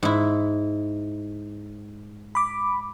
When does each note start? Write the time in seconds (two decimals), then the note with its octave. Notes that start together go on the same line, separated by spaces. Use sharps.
0.03 G#2 E4
2.35 B5 D6